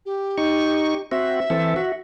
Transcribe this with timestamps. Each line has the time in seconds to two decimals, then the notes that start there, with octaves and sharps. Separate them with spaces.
0.06 G4
0.38 D#4 C#6
1.12 C4 F#4 E5
1.50 E3 C4 A4
1.76 F#4